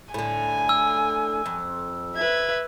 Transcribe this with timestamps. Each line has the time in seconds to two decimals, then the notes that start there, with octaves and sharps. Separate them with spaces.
0.14 A2 D3 G#5
0.69 E6
1.46 F2
2.16 B4 E5 G#6